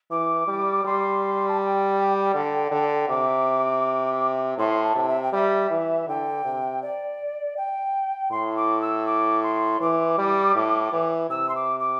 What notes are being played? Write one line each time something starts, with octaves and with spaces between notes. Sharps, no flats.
E3 D6
G3
G3 C6
A5
G5
D3
D3
C3 D6
A2 C6
A5
C3
E5
G5
G3 E5
E3
D3 G5
C3
D5
G5
A2 C6
D6
E6
D6
C6
E3 D6
G3
A2
E3
C3 E6
C6
D6
D6